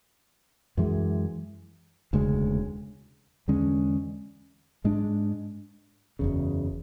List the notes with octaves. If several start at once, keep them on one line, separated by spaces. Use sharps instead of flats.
F#2 E3 G#3
E1 D2 C#3 G#3
E2 D3 G#3 C#4
G#2 G#3 D4
F#1 E2 C#3